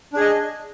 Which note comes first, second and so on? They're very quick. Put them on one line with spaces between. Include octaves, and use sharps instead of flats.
D4 G#4 D#5